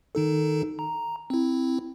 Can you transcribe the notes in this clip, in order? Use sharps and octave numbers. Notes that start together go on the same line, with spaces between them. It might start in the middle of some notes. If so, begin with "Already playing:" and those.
D#3 D#4 A4
A#5
C4 E4